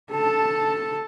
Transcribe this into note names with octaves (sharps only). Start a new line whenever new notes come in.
A4 A5